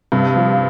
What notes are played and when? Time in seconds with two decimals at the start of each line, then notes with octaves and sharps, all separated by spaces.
0.12 G2 C3
0.36 F3